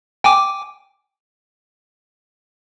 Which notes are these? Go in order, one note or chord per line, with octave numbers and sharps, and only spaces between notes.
G5 G#5 D6